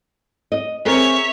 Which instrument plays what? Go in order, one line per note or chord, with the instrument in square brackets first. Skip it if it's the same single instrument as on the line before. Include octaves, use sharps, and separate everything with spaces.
[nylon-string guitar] D#5
[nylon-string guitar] C4 G#4 A#4 [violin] C#5 E5